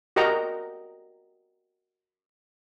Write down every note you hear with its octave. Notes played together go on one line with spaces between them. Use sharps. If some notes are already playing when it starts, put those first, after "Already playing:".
F#4 G4 A#4 D#5 G5 A#5